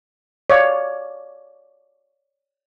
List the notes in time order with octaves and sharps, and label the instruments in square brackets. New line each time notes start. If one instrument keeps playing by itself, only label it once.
[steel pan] C#5 D5 F5